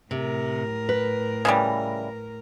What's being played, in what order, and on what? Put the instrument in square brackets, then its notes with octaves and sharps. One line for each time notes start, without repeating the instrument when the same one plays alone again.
[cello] A2 A#4 [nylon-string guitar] C3
[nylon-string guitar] B4
[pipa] C#3 E3 G3